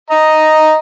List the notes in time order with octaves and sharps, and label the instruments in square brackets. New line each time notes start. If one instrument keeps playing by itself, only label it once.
[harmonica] D#5 A#5